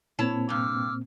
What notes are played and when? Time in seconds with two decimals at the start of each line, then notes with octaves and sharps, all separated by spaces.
0.19 A#2 A#3 C4 E4 C#5 A5
0.49 G2 C3 D6 E6 F6